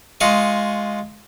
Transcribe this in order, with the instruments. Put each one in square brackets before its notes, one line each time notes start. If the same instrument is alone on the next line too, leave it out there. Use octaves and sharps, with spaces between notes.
[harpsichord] G#3 F4 D#5 C#6